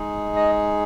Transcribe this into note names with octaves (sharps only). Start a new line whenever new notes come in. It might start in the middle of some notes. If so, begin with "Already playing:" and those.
Already playing: G#3 D#4 G#4
D#5